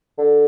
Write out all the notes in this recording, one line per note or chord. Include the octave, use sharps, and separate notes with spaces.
D3